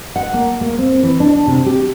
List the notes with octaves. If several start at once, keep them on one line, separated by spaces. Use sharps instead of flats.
F#5
A#3
A#3
C4
E3
D4
D4
C3
G4